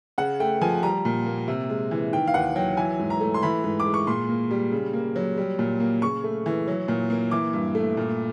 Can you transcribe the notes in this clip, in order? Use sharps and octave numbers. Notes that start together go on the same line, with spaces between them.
C#3 F#5
A3 G5
F3 G#5
G3 A#5
A#2
A#3
C3
G#3
E3
D#3 G5
F5
D#2 F#5
F#3 G5
E3 G#5
G#2
A#5
A3
C6
E3 B5
G#2
D6
G#3
C#6
A#2 C6
A#3
G3
C#3
A#3
F#3
G3
A#2
A#3
C#3 C#6
A3
E3
F#3
A#2
A#3
E3 D6
G2
A3
A#2